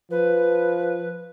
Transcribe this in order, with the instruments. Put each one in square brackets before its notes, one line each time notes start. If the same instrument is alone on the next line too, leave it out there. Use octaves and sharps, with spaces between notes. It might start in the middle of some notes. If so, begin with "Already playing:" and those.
[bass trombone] F3 [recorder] B4